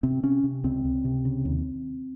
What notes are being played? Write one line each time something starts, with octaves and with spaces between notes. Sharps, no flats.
C3 C4
C3 C#4
C3
C#2 C4
C#2
C3
C#3
D#2